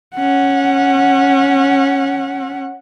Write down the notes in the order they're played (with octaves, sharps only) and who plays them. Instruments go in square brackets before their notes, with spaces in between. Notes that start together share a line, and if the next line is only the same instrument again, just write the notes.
[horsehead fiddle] C#4 F#5